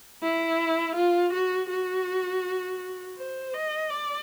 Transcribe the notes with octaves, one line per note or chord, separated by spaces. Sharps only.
E4
F4
F#4
F#4
C5
D#5
D5